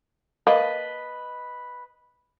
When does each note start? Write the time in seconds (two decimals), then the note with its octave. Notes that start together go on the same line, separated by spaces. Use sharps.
0.47 A#3 B4 D#5 A5